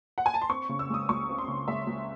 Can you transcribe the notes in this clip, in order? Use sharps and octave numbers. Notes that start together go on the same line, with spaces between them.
F#5
G#5
A5
C6
C4 C#6
C#3
E6
G#3 D#6
C#2 C#6
C4
C6
C#3
G#3 E5
C#2